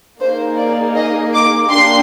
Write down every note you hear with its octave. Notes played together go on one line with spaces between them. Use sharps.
A#3 D#4 G#4 C5
D5
D#5
D6
A#3 D4 G4 C6